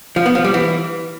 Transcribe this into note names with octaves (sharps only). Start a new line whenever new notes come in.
F3
B3
F3
G3
E3